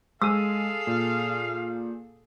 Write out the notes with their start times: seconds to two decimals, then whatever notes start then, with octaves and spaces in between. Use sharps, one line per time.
0.22 G#3 G#4 A4 F5 G#5 E6 D#7
0.87 A#2